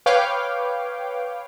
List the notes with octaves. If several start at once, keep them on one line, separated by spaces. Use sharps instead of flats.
B4 C#5 F5 G5 D6